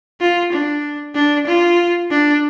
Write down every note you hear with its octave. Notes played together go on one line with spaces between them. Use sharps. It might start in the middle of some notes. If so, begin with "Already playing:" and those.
F4
D4
D4
F4
D4